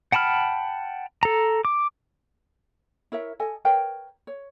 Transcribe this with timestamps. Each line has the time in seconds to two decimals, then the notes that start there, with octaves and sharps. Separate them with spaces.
0.12 F#5 G5 A5 B5 F6
1.23 A4 A#5
1.65 D6
3.12 E4 A#4 C#5 E5
3.40 A4 D#5 G#5
3.65 A#4 B4 C#5 G5
4.27 C#5